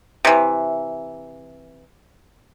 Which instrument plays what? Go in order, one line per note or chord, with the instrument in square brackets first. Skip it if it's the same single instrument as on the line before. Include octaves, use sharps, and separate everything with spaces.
[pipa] C3 E3